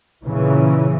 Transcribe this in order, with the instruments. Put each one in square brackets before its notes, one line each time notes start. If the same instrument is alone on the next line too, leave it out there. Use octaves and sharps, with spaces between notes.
[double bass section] A#2 C#3 E3